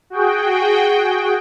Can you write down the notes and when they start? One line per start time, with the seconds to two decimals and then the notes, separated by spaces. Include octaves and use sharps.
0.10 F#4 G#4 G5